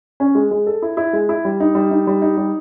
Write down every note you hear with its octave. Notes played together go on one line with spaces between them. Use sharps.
C#4
G#3
G#3
A4
E4
E4
G#3
E4
G3
D#4
G3
D#4
G3
D#4
G3